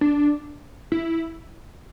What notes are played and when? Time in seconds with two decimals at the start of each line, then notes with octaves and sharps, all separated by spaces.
0.01 D4
0.92 E4